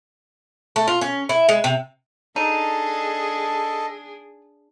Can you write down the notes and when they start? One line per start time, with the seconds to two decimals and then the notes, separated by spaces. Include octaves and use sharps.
0.76 A3
0.87 F4
1.01 C#4
1.29 E4
1.49 G#3
1.64 C3
2.36 D4 D#4 G#4 A4 D#5